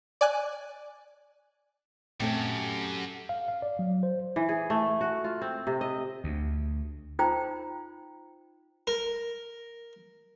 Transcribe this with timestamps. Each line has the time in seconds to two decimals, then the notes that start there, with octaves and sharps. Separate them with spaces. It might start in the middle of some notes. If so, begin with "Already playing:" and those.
0.21 D5 G#5 F#6
2.20 F#2 A#2 A3 C4 G4 A4
3.29 F5
3.48 F5
3.62 D5
3.79 F#3
4.03 C5
4.36 E3
4.49 G#4
4.70 A3
5.01 F#4
5.24 F4
5.42 C4
5.67 C3
5.81 D#5
6.24 D2
7.19 D#4 F4 C5 G5 A#5
8.87 A#4